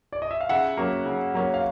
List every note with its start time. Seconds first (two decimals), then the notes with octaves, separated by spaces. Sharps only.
0.13 D5
0.22 D#5
0.31 E5
0.41 F5
0.49 C#3 E5 F#5
0.77 F#3 A#3 C#4
1.06 C#3
1.34 F#3 A#3 C#4
1.54 F5